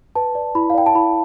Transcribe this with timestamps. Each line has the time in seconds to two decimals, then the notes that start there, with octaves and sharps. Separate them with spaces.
0.15 B4 A5
0.35 D5
0.55 E4 B5
0.70 F5
0.74 D5 G5
0.86 A5
0.95 E4 B5